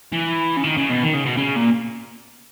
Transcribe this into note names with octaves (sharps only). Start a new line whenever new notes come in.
E3
C#3
D#3
C#3
B2
D#3
C#3
B2
C#3
A#2